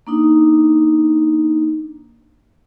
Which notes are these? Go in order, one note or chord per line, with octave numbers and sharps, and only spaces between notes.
A#3 D4 D#4